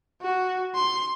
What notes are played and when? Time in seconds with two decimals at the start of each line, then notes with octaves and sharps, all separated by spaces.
0.22 F#4
0.74 C6